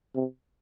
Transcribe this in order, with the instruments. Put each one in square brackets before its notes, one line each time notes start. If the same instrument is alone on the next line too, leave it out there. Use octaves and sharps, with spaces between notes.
[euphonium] C3